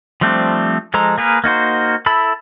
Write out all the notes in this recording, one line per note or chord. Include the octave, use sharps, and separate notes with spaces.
F3 G3 A3 C4 D4
F3 G#3 A4 C5 A#5
A#3 G#4 A#4 B4
A#3 D#4 F#4 C5
E4 A4 B5 E6